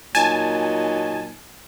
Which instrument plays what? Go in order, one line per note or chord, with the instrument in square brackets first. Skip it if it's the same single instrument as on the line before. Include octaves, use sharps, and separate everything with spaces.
[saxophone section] A#2 F#3 D#4 [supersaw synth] G#5 A5